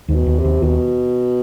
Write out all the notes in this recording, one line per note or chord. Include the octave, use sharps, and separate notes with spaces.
D#2 G#2
B2
D#2
C3
D#2
D#2 B2